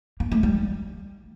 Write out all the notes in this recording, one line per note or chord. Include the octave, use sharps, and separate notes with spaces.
A#3
A3
G3